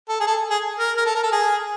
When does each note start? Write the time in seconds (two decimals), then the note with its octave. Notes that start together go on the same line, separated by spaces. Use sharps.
0.09 A4
0.20 G#4
0.27 A4
0.50 G#4
0.79 A#4
0.97 A#4
1.06 A4
1.15 A#4
1.23 A4
1.32 G#4